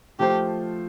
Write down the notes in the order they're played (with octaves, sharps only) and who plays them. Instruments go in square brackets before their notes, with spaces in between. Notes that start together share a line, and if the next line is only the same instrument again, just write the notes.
[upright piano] F3 A3 F4 C5 [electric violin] G4